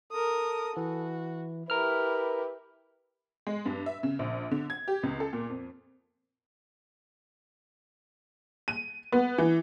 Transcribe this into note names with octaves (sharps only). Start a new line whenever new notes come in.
A4 A#4 D#6
E3 F#4
E4 G4 A#4 B4 F6
G#3
G2
E5
C#3
A#1
D3
G#6
G4
C#2
A4
A#2
F2
D#7
B3
E3